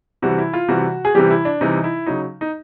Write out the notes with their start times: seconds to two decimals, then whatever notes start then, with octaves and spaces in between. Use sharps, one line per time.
0.22 C3 E3 G3 F#4
0.38 E4
0.53 F4
0.68 C3 E3 G3 F#4
1.05 G#4
1.15 C3 E3 G3 G4
1.30 E4
1.45 D4
1.61 C3 E3 G3 D#4
1.84 E4
2.06 C#3 F#3 D#4
2.41 D#4